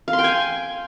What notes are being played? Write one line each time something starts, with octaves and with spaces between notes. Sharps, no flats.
F5
C6
G5
G#5